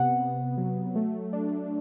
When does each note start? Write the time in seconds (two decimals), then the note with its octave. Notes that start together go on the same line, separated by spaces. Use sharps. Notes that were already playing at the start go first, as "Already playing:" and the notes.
Already playing: C3 B3 F#5
0.20 C3
0.58 F#3
0.96 A3
1.33 D4